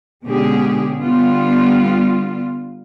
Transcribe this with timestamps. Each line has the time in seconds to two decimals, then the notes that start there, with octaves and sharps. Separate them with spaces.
0.25 B2 D3 G#3 C#4 G4 G#4
0.99 D3 G3 B3 F4